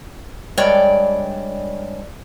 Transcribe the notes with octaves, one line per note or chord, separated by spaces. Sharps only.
G2 G#3 C#5 D5 G5